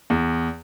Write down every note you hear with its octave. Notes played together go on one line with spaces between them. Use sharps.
E2